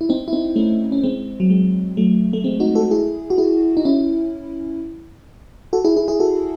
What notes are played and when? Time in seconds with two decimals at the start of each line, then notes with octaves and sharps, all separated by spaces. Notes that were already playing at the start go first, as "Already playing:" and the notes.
0.01 E4
0.09 C4 D#4
0.28 E4
0.33 C4 D#4
0.56 A3 C#4
0.92 C#4
1.03 G#3 C4
1.40 F#3
1.50 G#3
1.97 F#3 A3
2.33 A3
2.44 G#3 C4
2.60 D#4 F#4
2.75 F#4 A4
2.91 E4 G#4
3.30 F#4
3.38 E4 G#4
3.77 D#4
3.85 C#4 E4
5.73 F#4 A4
5.85 E4 G#4
5.96 E4 G#4
6.08 E4 G#4
6.20 F#4 A4